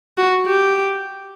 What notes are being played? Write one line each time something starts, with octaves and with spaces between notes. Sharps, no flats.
F#4
G4